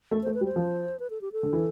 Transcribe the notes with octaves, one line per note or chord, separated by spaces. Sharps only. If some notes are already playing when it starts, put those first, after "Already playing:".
A3
A3 C5
B4
G3
C5
F3
B4
A4
G4
A4
D3
E3